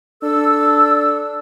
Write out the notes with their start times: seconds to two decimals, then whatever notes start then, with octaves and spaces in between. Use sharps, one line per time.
0.23 D4 A4 E6